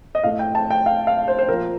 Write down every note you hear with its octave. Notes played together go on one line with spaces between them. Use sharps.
D#5
A2 A3 F5
G5
A5
G5
F5
F5
C5
C5
A#2 F3 A#3 A#4